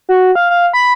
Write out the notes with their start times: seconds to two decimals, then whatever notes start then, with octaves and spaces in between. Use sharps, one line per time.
0.09 F#4
0.35 F5
0.50 F5
0.73 B5